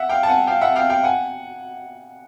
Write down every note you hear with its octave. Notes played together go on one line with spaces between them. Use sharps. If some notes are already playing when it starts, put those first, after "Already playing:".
Already playing: E5 F#5
F5 G5
A5
F#5 G#5
F5 G5
E5 F#5
F5 G5
F5 G5
F#5 G#5